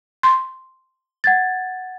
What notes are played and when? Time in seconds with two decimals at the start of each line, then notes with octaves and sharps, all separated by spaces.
0.23 C6
1.24 F#5 G#6 A6